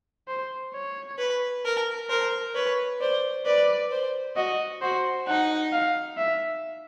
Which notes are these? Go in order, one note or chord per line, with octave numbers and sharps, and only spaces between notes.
C5
C#5
B4
A#4
A#4 C5
B4 C#5
C5 D5
B4 D5
C5
F#4 D#5
F#4 C5
D#4 F#5
F5
E5